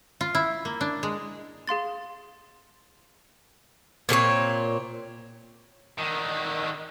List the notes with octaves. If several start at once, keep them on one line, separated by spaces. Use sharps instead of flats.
F4
E4
A#3
D4
G#3
G#4 F5 C6 A6
A#2 C4 A4 C#5
D3 D#3